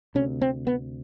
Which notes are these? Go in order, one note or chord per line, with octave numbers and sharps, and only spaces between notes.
D2 C3 C#4
C4
B3